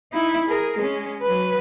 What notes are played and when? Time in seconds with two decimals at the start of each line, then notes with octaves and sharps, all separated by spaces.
0.13 D#4 E4
0.48 G#4 A#4
0.79 G#3 C#4
1.22 F#3 B4